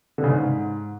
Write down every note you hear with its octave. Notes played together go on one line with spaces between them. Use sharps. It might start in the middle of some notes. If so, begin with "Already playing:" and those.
D3
C#3
G#2